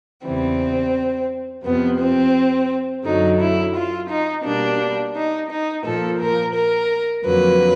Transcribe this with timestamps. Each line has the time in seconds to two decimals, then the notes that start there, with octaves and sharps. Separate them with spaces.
0.24 E2 C#3 E3 G3 C4
1.64 F2 C3 F3 B3
1.99 C4
3.04 F#2 D3 F#3 D#4
3.39 E4
3.74 F4
4.09 D#4
4.44 B2 G3 A#3 D4
5.14 D#4
5.49 D#4
5.84 A#2 F3 A#3 A4
6.19 A#4
6.54 A#4
7.24 F2 D3 F#3 A#3 B4